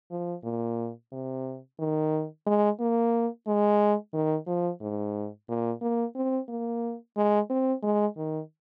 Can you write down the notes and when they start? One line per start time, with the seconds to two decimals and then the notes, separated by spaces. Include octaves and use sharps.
0.11 F3
0.44 A#2
1.12 C3
1.79 D#3
2.47 G#3
2.80 A#3
3.47 G#3
4.13 D#3
4.47 F3
4.81 G#2
5.49 A#2
5.81 A#3
6.16 C4
6.49 A#3
7.17 G#3
7.50 C4
7.83 G#3
8.17 D#3